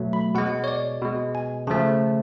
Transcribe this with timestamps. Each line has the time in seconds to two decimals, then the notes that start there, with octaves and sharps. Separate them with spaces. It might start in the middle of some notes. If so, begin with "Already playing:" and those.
Already playing: B2 F#3 A3
0.13 B5
0.35 B2 G#3 F#5
0.64 C#5
0.68 D5
1.02 B2 G#3
1.35 G#5
1.67 C#3 F3 A3 A5